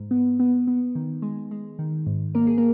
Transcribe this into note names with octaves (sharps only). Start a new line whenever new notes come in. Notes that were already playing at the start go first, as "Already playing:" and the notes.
Already playing: G#2
B3
B3
B3
D#3
G#3
G#3
D#3
G#2
A#3 A#4
G#4
A#3 A#4